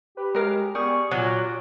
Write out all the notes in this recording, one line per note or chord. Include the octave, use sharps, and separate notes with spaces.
G4 B4
F#3 G#3 A#4 F5
G3 B3 G#4 C#6
A#2 F#3 F#4 D6